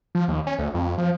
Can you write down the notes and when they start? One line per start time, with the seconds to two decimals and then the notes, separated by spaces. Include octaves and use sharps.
0.15 F3
0.28 D#2
0.47 C#4
0.59 D2
0.74 F2
0.98 F3